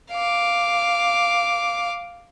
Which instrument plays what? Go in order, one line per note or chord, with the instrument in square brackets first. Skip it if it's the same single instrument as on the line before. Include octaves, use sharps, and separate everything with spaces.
[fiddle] F5 D6